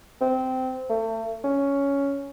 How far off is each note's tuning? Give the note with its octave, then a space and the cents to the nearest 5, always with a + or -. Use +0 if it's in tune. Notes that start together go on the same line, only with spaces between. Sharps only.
C4 -15
A3 +35
C#4 +10